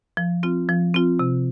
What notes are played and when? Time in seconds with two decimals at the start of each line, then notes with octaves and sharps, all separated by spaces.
0.17 F3
0.43 C4 F4
0.69 F3
0.94 C4 F4
1.19 C3